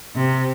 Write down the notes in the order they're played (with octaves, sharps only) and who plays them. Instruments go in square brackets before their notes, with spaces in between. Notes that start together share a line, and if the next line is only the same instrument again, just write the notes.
[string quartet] C3